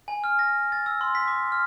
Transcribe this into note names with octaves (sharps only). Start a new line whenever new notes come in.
G#5
F6
A#6
A6
E6
C6
B6
D6
F6